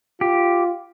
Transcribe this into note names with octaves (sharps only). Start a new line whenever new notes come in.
F4 G4